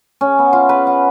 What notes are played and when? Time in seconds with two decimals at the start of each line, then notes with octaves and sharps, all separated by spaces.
0.21 C#4
0.39 B3
0.53 F4
0.69 B4
0.87 F#5